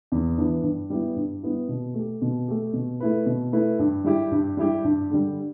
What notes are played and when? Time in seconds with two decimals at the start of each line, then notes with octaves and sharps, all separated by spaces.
0.12 E2
0.38 E3 B3 D4
0.63 G2
0.90 G3 B3 E4
1.16 G2
1.42 G3 B3 E4
1.68 B2
1.94 A3
1.99 G4
2.22 B2
2.48 A3 G4
2.73 B2
3.00 A3 E4 B4
3.26 B2
3.52 A3 E4 B4
3.79 G2
4.04 G3 E4 G4
4.31 G2
4.57 G3 E4 G4
4.84 G2
5.10 D3 G3